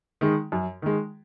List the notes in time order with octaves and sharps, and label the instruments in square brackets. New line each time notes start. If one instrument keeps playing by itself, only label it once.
[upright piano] D#3 G#3
F#2
D#3 G#3